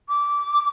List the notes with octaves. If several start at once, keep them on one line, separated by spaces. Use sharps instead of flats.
D6